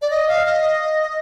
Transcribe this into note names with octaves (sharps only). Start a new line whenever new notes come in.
D5
D#5
F5
D#5